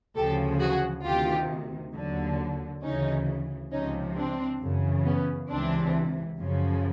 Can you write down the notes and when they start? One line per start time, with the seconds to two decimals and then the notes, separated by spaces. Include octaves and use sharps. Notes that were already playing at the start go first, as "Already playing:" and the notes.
0.16 D2 C#3 F3 G4 A4
0.60 F#4 G#4
1.05 D2 C3 D#3 F4 G4
1.94 D#2 D3 F#3
2.83 D2 C#3 E3 C#4 D#4
3.72 C#2 C3 F3 C#4 D#4
4.16 C4 D4
4.61 F#2 C#3 E3
5.05 B3 C#4
5.49 C#2 C3 E3 C4 D4
6.39 F#2 C#3 F3